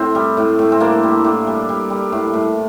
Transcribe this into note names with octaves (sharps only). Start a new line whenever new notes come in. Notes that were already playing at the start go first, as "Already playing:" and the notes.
Already playing: A2 C4
G3
A2
A2
C4
G3 A#3 D4
G3
A2
G3
G3
G3
A2
A2